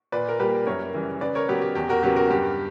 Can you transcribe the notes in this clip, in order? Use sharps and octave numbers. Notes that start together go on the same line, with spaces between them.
A#2 B4 D5
A#4
G3 A#3 G4 B4
F#2 A#4 C#5
C#3 E3 G3
C#3 B4 D5
A#4 C#5
F#3 B3 G4 B4
G4
E2 G4
F#4 A#4
C#3 F#3 B3 G4
F#4 A#4
G2 G4